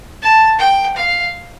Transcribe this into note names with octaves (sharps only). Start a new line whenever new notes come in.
A5
G5
F5